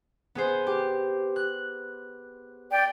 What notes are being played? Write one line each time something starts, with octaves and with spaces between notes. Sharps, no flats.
B3 G#4 C5
G4
F#6
D5 G5